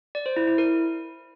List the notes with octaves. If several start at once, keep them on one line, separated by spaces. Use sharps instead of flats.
D5
C5
E4
E4
A#4